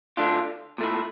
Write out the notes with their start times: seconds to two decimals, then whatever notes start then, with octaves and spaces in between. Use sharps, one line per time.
0.17 D3 A3 D4 F4
0.78 A#2 A3 E4